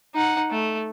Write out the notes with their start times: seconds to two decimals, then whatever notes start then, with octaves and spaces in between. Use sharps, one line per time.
0.15 D#4 F#5
0.51 A3